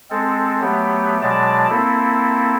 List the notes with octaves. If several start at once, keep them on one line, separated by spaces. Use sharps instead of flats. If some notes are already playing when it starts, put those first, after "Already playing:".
G#3 C4 A4
F#3 A3 B3 G4
B2 F#3 G#3 D5 A5
A#3 C4 E4 A4